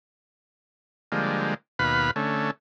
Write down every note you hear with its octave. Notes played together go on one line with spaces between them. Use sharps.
D3 F3 G3 G#3 A#3
D#2 B2 B4 F5 B5
D3 A3 C#4